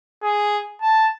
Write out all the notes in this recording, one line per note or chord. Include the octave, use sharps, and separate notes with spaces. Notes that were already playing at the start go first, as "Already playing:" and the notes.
G#4
A5